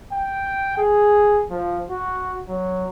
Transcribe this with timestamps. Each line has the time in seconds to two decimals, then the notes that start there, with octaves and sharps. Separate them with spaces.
0.12 G5
0.78 G#4
1.50 F3
1.90 F#4
2.48 F#3